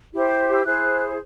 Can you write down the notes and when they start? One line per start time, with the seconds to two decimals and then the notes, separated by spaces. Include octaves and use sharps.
0.14 E4 G4 C5
0.27 D6
0.53 E6
0.66 E4 G#4 C5 F#6